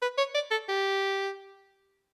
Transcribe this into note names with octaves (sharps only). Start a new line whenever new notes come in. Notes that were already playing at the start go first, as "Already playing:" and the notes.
B4
C#5
D5
A4
G4